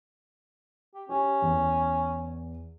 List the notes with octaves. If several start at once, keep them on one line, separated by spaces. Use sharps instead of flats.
G4
C#4 G4
E2